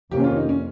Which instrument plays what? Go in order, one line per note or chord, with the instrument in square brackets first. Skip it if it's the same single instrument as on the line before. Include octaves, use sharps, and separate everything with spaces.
[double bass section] F2 C3 D#3 A#3 C#4 [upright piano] G4
[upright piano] F4
D#4
C#4